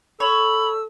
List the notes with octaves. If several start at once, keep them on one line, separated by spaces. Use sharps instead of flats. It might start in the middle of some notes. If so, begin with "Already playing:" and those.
A4 C#5 B5 E6